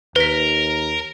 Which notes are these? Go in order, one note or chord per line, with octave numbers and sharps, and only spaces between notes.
D#2 A#4 B4 B6